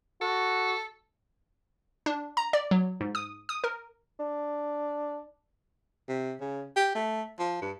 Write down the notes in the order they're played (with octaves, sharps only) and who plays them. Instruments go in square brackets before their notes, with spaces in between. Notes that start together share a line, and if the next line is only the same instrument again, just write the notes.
[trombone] F#4 [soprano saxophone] A4
[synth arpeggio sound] D4
A#5
D5
F#3
G#2
D#6
D#6
A#4
[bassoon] D4
[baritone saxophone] C3
C#3
G4
A3
F3
G2